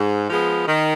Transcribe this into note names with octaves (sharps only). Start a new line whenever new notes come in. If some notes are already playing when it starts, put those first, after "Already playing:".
Already playing: G#2
F3 G#3 B3
D#3